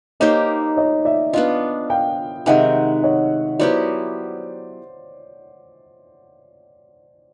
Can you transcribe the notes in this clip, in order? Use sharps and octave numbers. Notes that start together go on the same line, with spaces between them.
A#3 D#4 G4 C5 C#5 D#5
C#5 D#5
D5 E5
B3 D4 F4 D#5 F5
F5 G5
C3 D#3 G#3 E5 F#5
C#5 D#5
F#3 B3 E4 G4 C5 D5